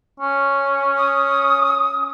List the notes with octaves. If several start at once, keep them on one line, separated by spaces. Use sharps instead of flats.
C#4
D#6